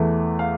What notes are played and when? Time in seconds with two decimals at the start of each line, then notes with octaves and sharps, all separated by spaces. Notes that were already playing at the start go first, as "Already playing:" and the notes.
Already playing: E2 E3 A3
0.39 F5